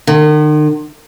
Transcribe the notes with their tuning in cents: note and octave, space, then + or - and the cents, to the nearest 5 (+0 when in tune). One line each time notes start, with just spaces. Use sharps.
D#3 -45